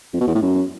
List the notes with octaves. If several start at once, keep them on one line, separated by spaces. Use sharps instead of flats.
F2
B2
E2
A2
F#2